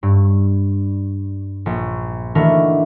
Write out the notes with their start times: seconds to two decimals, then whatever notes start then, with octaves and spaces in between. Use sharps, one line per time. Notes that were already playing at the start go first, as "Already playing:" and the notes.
0.03 G2
1.66 A#1
2.35 D#3 E3 A3 D4 F#4 A#4